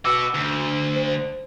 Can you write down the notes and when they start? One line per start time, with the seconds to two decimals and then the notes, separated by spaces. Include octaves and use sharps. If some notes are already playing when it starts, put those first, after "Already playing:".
0.05 F#4 B4 D6 E6 C#7
0.35 D2
0.96 C5